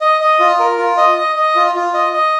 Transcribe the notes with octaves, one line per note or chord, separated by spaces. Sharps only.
D#5
D#5
F4
A#4
F4
D#5
D#5
D#5
F4
F4
D#5
D#5